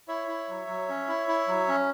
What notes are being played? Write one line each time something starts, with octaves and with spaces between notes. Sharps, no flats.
E4 C#5 E5
E4
F#3
F#3
C#4
E4
E4
F#3
C#4